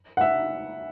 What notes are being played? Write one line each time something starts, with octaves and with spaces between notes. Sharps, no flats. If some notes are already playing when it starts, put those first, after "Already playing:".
F#5
E5